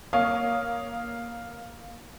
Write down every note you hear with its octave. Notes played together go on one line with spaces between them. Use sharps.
A#3 C#5 F5 D#6